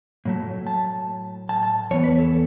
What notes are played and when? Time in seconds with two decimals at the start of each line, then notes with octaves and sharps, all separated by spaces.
0.25 A2 F#3 A3
0.67 A5
1.49 A5
1.63 A5
1.91 E2 E3 B3 C#5
2.04 B4
2.18 A4